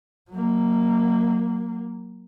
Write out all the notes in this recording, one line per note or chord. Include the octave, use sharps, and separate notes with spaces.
F#3 A#3